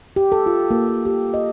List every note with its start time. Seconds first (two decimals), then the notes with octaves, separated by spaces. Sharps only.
0.16 G4
0.32 A4
0.46 F4
0.71 A#3
0.88 A#3
1.06 G4
1.34 D#5